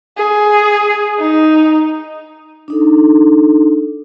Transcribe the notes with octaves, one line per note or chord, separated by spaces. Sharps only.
G#4
D#4
D4 D#4 A4